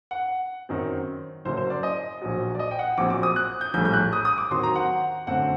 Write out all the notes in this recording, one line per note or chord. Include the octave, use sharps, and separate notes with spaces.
F#5
F#2 D#3 F#3 C4
F#1 F#2 F#3 A#3 C5
C5
D5
D#5
A#1 A#2 F#3
D5
D#5
G5
F#5
A#1 A#2 F#3 C4 D6
D6
D#6
F#6
G6
A#1 A2 G3 G6
G6
F#6
D#6
D#6
D6
D#2 D#3 F#3 C4 C6
A#5
F#5
F#2 D3 A3 C4 F#5